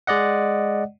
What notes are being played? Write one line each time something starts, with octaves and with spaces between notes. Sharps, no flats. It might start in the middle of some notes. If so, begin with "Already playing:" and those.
G#3 D5 D#5 F#5